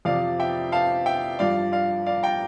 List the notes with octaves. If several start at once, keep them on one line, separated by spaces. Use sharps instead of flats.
F2 C3 F3 D5 F5
E5 G5
F5 A5
E5 G5
G2 F3 D5 F5
D5 F5
D5 F5
G5 A#5